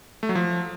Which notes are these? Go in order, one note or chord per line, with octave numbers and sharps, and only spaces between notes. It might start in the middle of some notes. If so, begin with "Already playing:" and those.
A3
F#3
F3